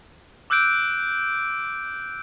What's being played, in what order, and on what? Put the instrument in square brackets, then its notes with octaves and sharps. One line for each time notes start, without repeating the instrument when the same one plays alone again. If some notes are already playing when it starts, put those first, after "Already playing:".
[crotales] D6 E6 F#6 G6 D7